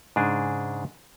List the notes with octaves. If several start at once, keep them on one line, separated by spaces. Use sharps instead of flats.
G#2 C#3 D4 G#4